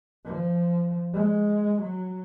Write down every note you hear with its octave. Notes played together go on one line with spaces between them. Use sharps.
F3
G#3
F#3